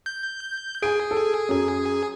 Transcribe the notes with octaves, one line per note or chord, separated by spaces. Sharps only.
G6
G#4 G#5 G6 D7
A4
F#2 F#3